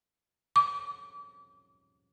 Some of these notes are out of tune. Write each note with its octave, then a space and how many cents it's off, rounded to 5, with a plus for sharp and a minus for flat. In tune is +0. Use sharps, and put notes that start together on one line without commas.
D6 -35